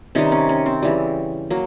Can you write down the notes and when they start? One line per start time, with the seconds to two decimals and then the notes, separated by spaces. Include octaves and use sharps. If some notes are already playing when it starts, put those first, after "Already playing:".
0.15 C3 D#3 G3 C#4 D#4
0.32 C#4
0.49 C#4
0.66 C4
0.82 C#3 E3 G3
1.50 F#3 A#3